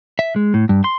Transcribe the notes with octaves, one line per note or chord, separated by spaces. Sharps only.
E5
G#3
A2
G2
C6